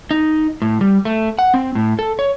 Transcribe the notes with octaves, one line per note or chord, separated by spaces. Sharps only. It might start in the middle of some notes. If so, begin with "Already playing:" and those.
D#4
A2
G3
A3
F#5
C4
A2
A4
C#5